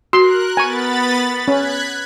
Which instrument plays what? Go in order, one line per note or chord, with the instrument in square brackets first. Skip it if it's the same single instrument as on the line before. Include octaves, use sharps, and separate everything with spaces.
[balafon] F#4 [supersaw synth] A#4 F#6 [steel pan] C6
[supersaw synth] B3 B5 A6 [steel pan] G#5 C#6
[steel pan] C#4 [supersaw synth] F#6 G#6 B6